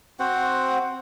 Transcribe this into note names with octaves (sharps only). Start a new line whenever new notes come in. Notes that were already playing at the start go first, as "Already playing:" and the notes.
C4 F#4 C5 F#5